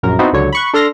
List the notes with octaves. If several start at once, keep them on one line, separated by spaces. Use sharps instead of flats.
A#1 F#2 A#4
B3 C4 D#4 E4 F#4
C#2 D3 F#3 C#5
B5 C#6 F#6
D4 A4 C6 F6 A#6